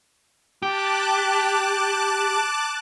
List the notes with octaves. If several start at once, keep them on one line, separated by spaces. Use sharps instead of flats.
G4 A5 D6 F#6